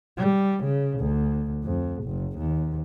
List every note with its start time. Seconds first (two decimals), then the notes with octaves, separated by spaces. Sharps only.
0.17 G3
0.64 C#3
0.99 D2
1.64 F2
2.04 F#1
2.38 D#2